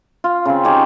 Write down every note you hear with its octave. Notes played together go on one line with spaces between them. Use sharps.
F4
C#3 C4
D#4 G4 G#4 C#5